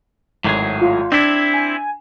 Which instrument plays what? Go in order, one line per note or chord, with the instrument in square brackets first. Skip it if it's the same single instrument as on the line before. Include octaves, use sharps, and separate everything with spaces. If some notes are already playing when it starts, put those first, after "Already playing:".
[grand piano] G#1 [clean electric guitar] A2 F#3 G#4
[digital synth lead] F4
[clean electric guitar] C4 E4 [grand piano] D4 [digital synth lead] G#6
[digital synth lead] G#5